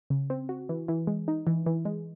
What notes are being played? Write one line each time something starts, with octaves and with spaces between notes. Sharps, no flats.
C#3
C4
F#4
E3
E3
G#3
D#4
E3
E3
G#3